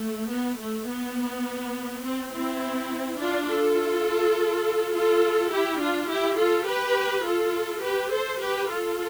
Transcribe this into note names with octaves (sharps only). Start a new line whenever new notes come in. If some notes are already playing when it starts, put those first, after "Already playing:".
Already playing: A3
B3
A3
B3
C4
C4 E4
D4 F4
F4 A4
F4 A4
E4 G4
D4 F4
E4 G4
F4 A4
G4 B4
F4 A4
G4 B4
A4 C5
G4 B4
F4 A4